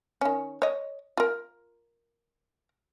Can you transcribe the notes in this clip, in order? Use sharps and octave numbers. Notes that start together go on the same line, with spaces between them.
D#3 C#4
C#5 D#5
F4 A#4